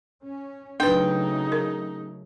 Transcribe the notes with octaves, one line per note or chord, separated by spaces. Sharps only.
C#4
C#3 F#3 A3 D4 D#4 B4 G5
A#4